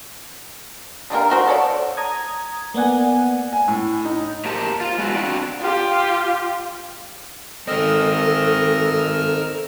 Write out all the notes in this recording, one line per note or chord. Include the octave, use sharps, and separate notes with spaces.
D3 G3 A#3 A#4
A3 F#4 C5
A4 C#5 D5
A#5 D#6 G#6
A#3 B3 D5 F#5 G#5
G#5
A2
D#4
A#3 G4 A#4 C5 A5
F4
G#3 B3 E4 F#4
C4 D4 F#4 D5
F4 G4
D#3 C4 A4 A#4 D#5 E6 F6